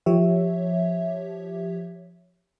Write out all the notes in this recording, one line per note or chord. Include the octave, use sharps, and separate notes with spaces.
F3 G4 C#5 E5